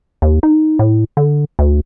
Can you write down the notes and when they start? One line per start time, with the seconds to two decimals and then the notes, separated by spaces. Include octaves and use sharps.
0.22 D#2
0.43 D#4
0.79 A2
1.17 D3
1.59 D2